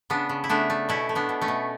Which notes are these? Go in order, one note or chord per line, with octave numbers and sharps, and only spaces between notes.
C#3 B3 D4
C#3
E4
A3 B3 D4
A3
B2 C#4 E4
A3
B3 D4
B2
A3 C#4
B2